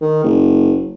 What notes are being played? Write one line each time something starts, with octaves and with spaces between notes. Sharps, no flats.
D#3
F#1